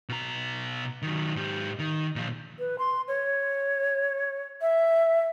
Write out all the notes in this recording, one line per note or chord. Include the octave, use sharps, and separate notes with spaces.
B2 A#5
D#3 F#3
G#2 G4
D#3
A#2 F3
B4
C6
C#5
E5